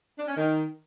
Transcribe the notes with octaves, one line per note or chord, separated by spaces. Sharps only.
D4
C#4
D#3